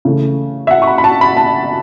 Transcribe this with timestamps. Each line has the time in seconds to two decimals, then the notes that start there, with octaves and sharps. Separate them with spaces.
0.05 C#3 E3 A3
0.67 E5
0.71 F#5
0.82 C#6
0.87 B5
0.98 B5
1.04 A5
1.21 B5
1.37 A5